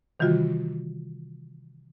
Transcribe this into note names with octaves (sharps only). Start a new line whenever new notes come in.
C3 D#3 E3 G3 F4 F#4